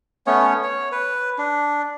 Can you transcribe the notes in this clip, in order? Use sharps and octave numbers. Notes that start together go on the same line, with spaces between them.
A3 B3 C#4 C#5
C#5
B4
D4